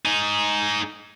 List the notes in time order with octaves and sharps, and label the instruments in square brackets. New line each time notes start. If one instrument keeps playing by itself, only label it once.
[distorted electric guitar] D#4 G#4